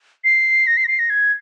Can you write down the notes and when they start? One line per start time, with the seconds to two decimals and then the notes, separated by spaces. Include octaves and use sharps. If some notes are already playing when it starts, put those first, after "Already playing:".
0.24 C7
0.67 A#6
0.77 C7
0.84 A#6
0.88 C7
0.99 A#6
1.10 G#6